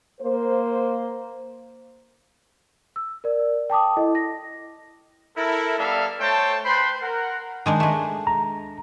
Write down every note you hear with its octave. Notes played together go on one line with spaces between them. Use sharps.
A#3 C5
E6
A#4 D5
G5 A5 D6 D#6
E4 A4 D#5
A#6
E4 A4 A#4
G3 B3 A4 D5 E5 F5
A3 A4 C5 C#5 G5 A5
B4 C5 G5 B5 C6
A#4 F#5
D#3 G#3 D4
G#3 A3
A#5